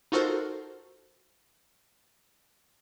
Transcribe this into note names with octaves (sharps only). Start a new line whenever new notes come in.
D#4 F4 F#4 A4 A#4 C5